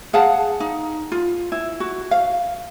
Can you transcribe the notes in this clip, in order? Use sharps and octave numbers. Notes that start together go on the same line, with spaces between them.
G#4 F5 F#5 A5
D#4
F4
E4
F#4
F5